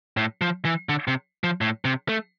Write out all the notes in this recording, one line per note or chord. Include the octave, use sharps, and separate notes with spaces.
A2
F3
E3
D3
C3
F3
A2
C3
A3